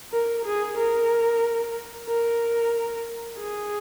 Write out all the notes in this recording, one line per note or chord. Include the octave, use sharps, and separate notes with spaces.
A#4
G#4
A#4
A#4
G#4